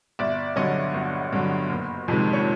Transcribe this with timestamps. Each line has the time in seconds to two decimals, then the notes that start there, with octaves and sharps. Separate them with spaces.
0.19 G1 D5 E5
0.56 G2 D3 F#3 C#5 D#5
0.94 G1
1.32 G2 D3 F#3
1.69 F#1
2.08 F2 C3 D#3 G#3
2.33 C#5